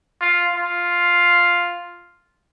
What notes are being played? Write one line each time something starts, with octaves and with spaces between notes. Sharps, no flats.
F4
F4